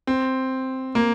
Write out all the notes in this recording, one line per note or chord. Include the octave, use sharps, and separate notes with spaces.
C4
A#3